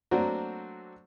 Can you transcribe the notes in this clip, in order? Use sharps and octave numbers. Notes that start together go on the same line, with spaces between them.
F#3 A3 A#3 C4 D4 F#4